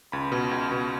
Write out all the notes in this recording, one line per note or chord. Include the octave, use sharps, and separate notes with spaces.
C#2 B5
B2
C#2
B2